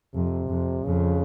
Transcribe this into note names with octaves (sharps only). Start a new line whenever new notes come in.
F2 C3
F2
F2 C#3